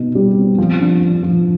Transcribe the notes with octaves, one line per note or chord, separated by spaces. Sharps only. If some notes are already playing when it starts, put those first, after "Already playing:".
Already playing: B2 D#4
G3
C4
F3
D4
F3
F3